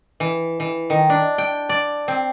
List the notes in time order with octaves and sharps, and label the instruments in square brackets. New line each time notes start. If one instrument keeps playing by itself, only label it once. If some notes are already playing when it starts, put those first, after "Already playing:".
[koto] E3
E3
D#3
D4
G5
D5
C4